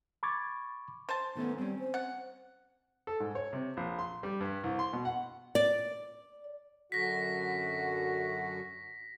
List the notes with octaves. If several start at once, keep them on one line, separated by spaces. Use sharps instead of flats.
B5 C#6 D6 G#6 A6
C5 A5
D#3 A3 B3 C#4
G3 C4 C#4
C5
F#5
A4
G#2
C#5
C3
A#1
C6
G3
G2
C2
C6
B2
F#5
D5
F#2 D3 F#4 A#6 B6